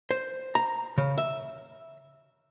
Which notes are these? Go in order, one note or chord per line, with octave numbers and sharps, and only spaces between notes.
C5
A#5
C#3
E5